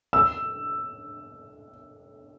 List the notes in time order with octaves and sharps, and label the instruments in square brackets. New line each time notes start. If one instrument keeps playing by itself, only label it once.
[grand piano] E6